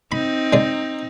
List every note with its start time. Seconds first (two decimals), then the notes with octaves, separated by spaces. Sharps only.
0.12 C4 D#4 B5
0.53 G#3 D5